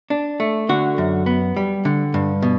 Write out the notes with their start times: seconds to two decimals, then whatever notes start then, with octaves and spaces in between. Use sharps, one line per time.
0.10 D4
0.40 A3
0.69 D3 F#4
0.98 F#2
1.26 B3
1.56 G3
1.85 D3
2.14 G2
2.42 B2